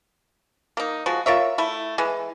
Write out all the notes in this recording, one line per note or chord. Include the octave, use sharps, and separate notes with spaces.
A#3 D#4
F3 G#3 F#4
F4 A#4 C#5 E5
A3 E4
E3 G#3